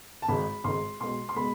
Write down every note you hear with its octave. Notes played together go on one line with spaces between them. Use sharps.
A5
G#1 G#2 G#3 B5
G#1 G#2 G#3 C6
B1 B2 G#3 C6
C6
B2 G#3 B5